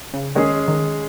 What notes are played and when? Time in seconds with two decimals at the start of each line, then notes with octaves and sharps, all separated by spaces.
0.14 C#3
0.35 D#3 G#3 C#4 G#4
0.68 D#3